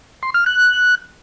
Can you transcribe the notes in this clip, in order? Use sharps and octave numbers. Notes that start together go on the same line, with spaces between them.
C6
F6
F#6